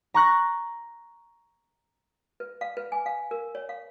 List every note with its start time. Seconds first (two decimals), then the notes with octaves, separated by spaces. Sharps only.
0.14 A#5 C#6 F#6 A#6
2.40 B4
2.61 F5
2.77 B4
2.92 G#5
3.06 F5
3.31 A#4
3.55 C#5
3.69 F5